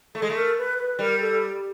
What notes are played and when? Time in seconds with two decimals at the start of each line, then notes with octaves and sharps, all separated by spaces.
0.15 A3 A4
0.22 G#3
0.30 A3
0.35 A#4
0.58 B4
0.78 B4
0.99 G3 A#4
1.19 A4